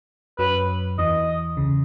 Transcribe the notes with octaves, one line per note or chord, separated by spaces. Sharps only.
F#2 F#3 B4
E2 E3 D#5
C#2 C#3